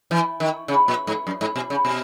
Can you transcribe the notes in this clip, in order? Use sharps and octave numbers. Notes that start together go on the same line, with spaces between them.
E3
D#3
C#3
A#2
G#2
F#2
G#2
B2
C#3
B2